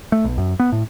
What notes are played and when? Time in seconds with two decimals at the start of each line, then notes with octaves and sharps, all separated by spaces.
0.12 A3
0.25 B1
0.38 F#2
0.60 B3
0.72 A2